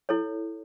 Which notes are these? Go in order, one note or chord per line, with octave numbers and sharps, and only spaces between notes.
E4 A4 C#5